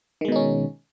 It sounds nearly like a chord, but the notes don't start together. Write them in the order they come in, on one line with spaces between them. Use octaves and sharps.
D#3 G#3 B2 D#4 C#4